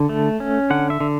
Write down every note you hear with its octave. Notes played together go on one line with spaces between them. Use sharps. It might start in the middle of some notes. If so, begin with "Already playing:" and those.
Already playing: D3
A3
C#4
D3 F#5
E5
D3